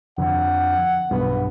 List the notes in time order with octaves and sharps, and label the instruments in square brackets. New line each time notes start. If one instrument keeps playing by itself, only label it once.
[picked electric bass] F2 D3 [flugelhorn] F#5
[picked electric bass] B1 G2 [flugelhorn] B3